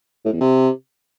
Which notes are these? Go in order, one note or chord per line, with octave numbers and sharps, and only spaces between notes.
A2
E2
C3